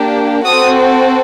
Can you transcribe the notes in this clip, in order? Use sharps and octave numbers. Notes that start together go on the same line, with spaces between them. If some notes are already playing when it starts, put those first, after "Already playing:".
Already playing: A#3 D4 G4
C4 F#4 A4 D#6